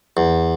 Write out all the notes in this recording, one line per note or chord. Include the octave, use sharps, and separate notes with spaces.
E2